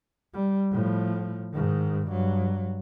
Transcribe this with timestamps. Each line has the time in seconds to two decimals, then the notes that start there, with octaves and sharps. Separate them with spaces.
0.33 G3
0.71 A2 F3
1.53 G#2 D#3
2.07 G2 F#3